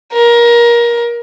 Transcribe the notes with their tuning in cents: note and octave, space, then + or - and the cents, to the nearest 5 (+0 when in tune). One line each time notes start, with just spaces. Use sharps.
A#4 +20